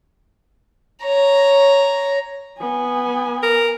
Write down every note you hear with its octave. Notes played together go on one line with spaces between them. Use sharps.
C#5 A#5
B3 G#5
A#4